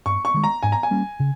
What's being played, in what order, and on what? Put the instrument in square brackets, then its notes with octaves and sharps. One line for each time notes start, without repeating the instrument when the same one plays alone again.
[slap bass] G2 [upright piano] C#6
[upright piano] C#6
[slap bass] D#3 G#3
[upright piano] A#5
[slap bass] G#2 [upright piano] G#5
[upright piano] A#5
G#5
[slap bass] G3 A#3 C#4
C#3